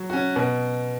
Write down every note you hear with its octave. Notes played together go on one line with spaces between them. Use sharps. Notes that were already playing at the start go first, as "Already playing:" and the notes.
Already playing: F#3
C#4 F#4
B2